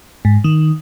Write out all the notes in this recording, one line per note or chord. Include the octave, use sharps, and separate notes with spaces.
G#2
D#3